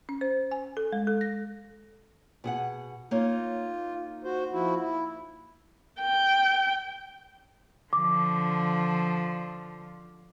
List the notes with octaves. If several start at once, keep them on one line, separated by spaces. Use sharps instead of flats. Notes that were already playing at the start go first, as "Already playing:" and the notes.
C#4
C5
G#5
A4
G#3
A4
A#6
B2 G#4 F#5
A#3 D#4 F4 C#5
F#4 C5
F3 E4 F#4
E4
G5
D3 F3 D6